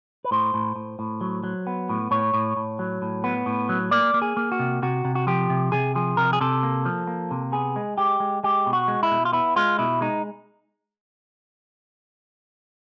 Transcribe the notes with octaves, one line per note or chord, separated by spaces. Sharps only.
B4
A2 C5
A2
A2
A2
F#3
F#3
B3
A2
A2 C#5
A2
A2
F#3
A2
B3
A2
F#3
A#3 D5
A#3
G#4
A#3
F#4
C3
C3 F#4
C3
F#4
F3 G4
C3
C3 G#4
F3 G#4
C3 A#4
G#4
C3 A4
A#3
F3
A#3
C3
B3 G#4
G#3
G#3 G4
G#3
G#3 G4
B2
F#4
G#3
E4
B2
F4
B3 E4
G#3 F4
B2 E4
G#3 D#4